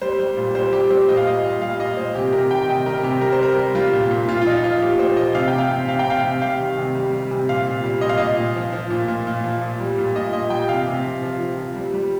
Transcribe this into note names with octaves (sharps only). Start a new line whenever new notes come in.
G3 C5
G3
A#2
G3 C5
G3 G4
G3 C5
A#2 D#5
F5
G3 D#5
A#2
G3 F5
A#2 D#5
A#2 C5
C3 G4
C3 A#4
D#3 G5
C3 D#5
G3 A#4
C3 G4
G3 A#4
C5
G3 A#4
G3
G3 F4
A#2
A#2
A#2 F4
F4
F3 D#4
F3 F4
A#2 G4
A#2 C5
F3 D#5
C3 F5
G5
C3
F5
C3
C3 F5
G5
C3 F5
C3
G3 F5
D#3
C3
G3
G3
C3
A#2 F5
A#2
G3
A#2 D#5
F5
A#2 D#5
A#2
F3
F3
A#2
A#2
A#2
F3
A#2
G3
A#2
A#2 D#5
A#2 D#5
G3 G5
C3 F5
C3
F3
F3
F3
F3
G3
G3